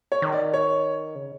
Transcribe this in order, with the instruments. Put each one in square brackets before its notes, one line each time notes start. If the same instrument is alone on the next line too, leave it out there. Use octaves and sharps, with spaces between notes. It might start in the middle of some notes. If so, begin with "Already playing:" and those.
[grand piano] C#5
[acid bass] D#3
[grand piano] D5
C#5
[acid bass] C#3